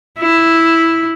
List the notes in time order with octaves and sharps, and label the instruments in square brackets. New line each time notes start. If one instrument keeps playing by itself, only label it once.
[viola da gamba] E4